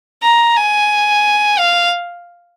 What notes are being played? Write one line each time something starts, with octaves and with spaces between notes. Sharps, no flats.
A#5
G#5
F5